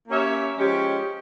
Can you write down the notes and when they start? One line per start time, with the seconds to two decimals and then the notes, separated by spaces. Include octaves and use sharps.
0.08 A#3 C#4 G4 C#5 E5
0.58 F3 G#3 C#4 G4